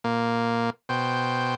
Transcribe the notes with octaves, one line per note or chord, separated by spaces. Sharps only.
A#2 A#3
B2 C5 G5